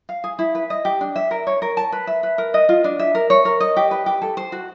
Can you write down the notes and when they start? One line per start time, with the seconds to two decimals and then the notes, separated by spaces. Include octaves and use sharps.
0.09 F5
0.24 G#4
0.39 E4
0.55 B4
0.70 D#5
0.85 G4
1.01 D4
1.16 E5
1.31 A#4
1.47 C#5
1.62 A#4
1.77 A5
1.92 B4
2.07 E5
2.23 B4
2.38 A#4
2.54 D#5
2.69 F4
2.84 D4
2.99 E5
3.15 A#4
3.30 C#5
3.45 A#4
3.60 D#5
3.77 G4
3.91 B4
4.06 G4
4.22 A4
4.37 C5
4.52 F#4